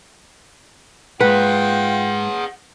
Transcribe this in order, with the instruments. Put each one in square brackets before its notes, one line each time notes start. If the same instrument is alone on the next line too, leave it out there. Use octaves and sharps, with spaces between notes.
[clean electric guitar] G#2 [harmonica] F4 G5 [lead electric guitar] G#4 F#5 [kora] B4